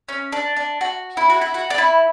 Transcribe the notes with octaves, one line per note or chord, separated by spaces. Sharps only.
C#4
D4
D4
F#4
E4
F#4
E4
F#4
D4
E4